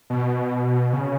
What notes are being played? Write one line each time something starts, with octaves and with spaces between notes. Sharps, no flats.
B2
C#3